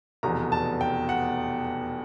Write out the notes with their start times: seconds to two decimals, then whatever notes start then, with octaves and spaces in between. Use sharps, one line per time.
0.23 F1 E2 B2 A#5
0.52 A5
0.81 G5
1.09 F#5